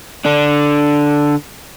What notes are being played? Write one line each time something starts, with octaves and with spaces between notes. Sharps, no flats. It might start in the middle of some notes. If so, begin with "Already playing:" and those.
D3 D4